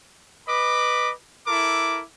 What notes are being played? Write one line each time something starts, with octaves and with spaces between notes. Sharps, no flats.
B4 D#5 B5 D6
E4 A4 A#4 D6